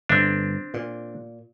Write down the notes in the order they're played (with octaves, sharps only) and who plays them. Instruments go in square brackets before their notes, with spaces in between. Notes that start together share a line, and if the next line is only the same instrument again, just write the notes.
[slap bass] G1 [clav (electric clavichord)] C4 D4
[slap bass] A#2